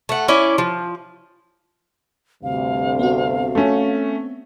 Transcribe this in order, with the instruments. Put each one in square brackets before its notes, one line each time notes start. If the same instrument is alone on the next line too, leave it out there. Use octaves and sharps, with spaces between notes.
[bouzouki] A3 F#5
C#4 E4 D5
F3
[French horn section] D2 G2 C3 [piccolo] F5
[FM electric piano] B3 C4 F#4
[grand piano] A3 C#4